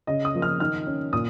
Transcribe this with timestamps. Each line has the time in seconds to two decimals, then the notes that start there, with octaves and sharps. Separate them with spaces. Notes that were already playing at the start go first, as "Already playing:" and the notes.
0.07 C#3 D#5
0.25 D#6
0.35 F3 A#3
0.42 F6
0.60 D#3 F6
0.87 C#4
1.13 A#2 D#6